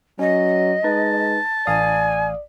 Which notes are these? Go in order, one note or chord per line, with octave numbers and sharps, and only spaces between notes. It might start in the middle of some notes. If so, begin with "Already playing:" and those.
F#3 C#4 D#5
G#3 D#4 B4 A5
A1 D5 F5 G#5 D#6